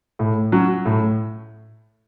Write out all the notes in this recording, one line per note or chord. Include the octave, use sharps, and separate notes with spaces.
A2
F#3 C#4
A2